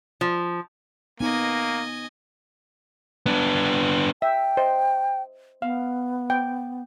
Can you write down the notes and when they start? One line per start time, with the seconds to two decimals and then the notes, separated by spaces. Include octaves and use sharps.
0.21 F3
1.20 A#3 B3 D#4 D#5 G#5
3.26 B3 D4
4.22 E5 G5
4.57 C5 D#5
5.62 B3 F5
6.30 G5